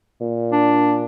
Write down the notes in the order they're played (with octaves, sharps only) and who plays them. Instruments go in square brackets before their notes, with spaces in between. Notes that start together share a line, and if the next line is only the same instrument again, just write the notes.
[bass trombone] A#2
[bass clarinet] D4